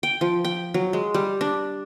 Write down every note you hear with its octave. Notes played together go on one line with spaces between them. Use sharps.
G5
F3
G5
F#3
G#3
G3
D4